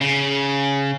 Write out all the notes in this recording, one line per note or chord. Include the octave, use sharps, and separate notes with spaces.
C#3